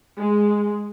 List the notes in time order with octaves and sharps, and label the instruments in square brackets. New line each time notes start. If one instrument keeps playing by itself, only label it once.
[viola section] G#3